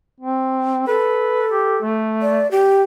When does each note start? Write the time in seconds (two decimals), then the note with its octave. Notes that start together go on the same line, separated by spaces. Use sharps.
0.20 C4
0.87 A4 B4
1.52 G4
1.82 A3
2.22 D5
2.51 G4